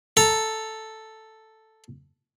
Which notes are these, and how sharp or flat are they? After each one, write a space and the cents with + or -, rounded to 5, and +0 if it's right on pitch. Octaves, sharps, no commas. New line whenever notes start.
A4 +0 A#5 +0